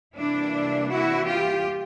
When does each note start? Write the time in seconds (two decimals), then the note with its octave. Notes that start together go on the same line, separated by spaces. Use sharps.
0.17 C3 E3 G3 A#3 D4 E4
0.90 E4 F#4
1.26 F4 G4